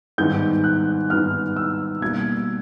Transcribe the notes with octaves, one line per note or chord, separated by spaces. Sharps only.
G#2 D#3 G3 B3 G6
F#6
G#2 D#3 G3 B3 F6
E6
B2 G3 A#3 G#6